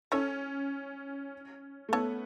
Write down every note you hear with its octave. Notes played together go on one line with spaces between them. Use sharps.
C#4 A4 C#5
A3
B3 A4 C#5